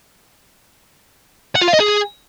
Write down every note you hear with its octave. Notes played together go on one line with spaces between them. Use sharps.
F#5
F4
F5
D#5
G#4